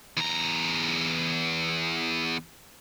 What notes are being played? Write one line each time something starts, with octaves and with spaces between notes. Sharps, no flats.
E2 A#5